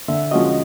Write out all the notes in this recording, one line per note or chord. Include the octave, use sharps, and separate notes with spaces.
D3 E5
F3 G#3 C#4 F#4 D#5